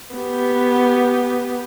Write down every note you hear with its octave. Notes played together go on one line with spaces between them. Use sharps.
B3 G4